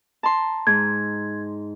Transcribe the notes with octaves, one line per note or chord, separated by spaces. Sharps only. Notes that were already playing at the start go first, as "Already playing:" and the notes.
A5 A#5 C6
G#2 G#6